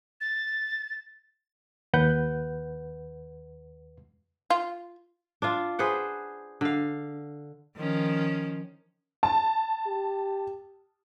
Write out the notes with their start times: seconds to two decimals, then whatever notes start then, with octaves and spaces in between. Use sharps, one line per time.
0.21 A6
1.93 D#2 B4 F#5 G6
4.50 F4
5.42 D4 F4
5.79 G#4 B4 C5 F#5
6.61 D3 F5
7.77 D#3 F3 C#4
9.23 A5
9.87 G4